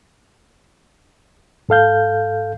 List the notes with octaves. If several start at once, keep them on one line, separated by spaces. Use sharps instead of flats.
G#2 A4 F5 G6